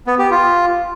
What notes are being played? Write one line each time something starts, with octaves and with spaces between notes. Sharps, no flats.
B3
G4
F4